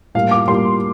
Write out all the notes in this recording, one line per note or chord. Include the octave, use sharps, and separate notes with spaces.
A2 G3 A#3 F5
D6
A2 G3 A#3 C6